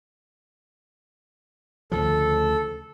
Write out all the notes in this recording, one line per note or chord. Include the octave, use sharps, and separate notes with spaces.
D2 C#3 F3 A4